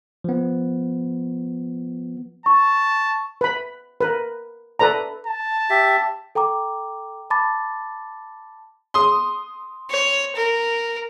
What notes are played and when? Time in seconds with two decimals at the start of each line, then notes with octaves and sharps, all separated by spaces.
0.24 F3 B3
2.46 A5 C#6
3.41 B4 B5
4.01 A#4 B4
4.79 A4 B4 D5 A#5
5.27 A5
5.70 G4 E5
6.35 A4 G5 A#5 D6
7.30 A5 B5 D6 A6
8.94 C6 D#6
9.90 C#5
10.36 A#4